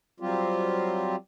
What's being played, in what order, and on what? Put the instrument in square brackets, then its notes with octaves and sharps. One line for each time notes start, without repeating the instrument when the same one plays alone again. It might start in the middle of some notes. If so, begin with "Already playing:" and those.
[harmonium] F#3 G3 C4 F4 G4